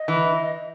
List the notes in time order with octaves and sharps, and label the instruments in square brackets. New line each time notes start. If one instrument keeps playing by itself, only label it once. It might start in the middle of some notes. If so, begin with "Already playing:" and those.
Already playing: [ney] D#5
[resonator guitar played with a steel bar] E3